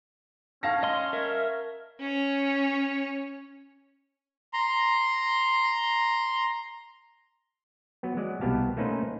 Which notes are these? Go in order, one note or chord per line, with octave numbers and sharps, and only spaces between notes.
C#4 F5 A5 A#6
D#5 C6
A#4 E5
C#4 C#5
A#5 C6
F#3 B3
F#3 G#3 D5
C2 B2 B3 G4 F5 A5
A3 A#3 C#4 D#4 B4 C5